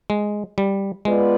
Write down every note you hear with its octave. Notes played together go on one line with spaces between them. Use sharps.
G#3
G3
G#3 B3 F4 B4 D5